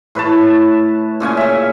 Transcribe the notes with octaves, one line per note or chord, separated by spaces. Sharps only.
A2 B4 C#5 A5
A#2 C#3 C#4 G#5
C#3 E5